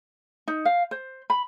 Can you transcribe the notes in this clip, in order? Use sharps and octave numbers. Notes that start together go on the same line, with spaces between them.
D#4
F5
C5
B5